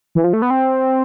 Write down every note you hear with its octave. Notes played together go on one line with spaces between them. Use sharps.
E3
F3
A3
B3
C4